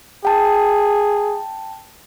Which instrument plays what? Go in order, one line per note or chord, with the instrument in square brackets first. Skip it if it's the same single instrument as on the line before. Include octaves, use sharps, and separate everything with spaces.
[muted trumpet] G#4 [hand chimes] G5 A5